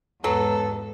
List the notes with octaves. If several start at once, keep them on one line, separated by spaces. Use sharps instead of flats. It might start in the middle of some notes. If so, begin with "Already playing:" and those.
E2 G#2 F#3 A4 B4